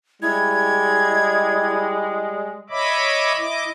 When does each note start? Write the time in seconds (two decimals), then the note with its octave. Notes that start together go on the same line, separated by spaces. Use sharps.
0.23 G3 G#3 E4 G#6
2.70 C#5 D#5 E5 B5 D6
3.37 E4 D#5 D6